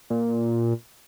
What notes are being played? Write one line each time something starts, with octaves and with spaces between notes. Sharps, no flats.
A#2